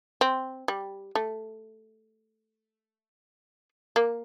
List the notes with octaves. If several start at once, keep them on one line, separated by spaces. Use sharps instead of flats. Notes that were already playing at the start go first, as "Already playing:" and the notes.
C4
G3
A3
A#3